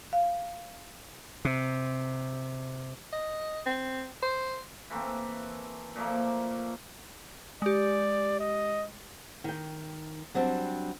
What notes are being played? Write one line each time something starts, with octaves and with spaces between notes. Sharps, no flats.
F5
C3
D#5
C4
C5
E3 A3 A#3 C4
A#2 F3 A3 A#3
G#3 G4 D5
D#5
D#3 G5
F#3 G3 C4 D4